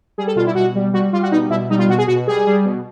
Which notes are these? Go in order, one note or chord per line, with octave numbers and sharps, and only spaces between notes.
G3 G#4
A4
B2 F4
E4
B2 F#4
G3
G3 F#4
G3 F4
F#4
B2 D#4
B2 E4
G3 D#4
F4
B2 F#4
G#4
B2 F#4
G3 G#4
G3
B2